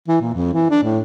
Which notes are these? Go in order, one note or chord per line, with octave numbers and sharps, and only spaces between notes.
E3
A#2
F2
E3
D4
A2